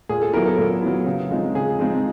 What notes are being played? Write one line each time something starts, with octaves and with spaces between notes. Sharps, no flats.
A#2 G#4
A4
F#3 B3 E4 A#4
A4
A#2
F#3 B3 E4
C#3
F3 G#3 C4 D#4
C#3 G#4
F3 G#3 C4 D#4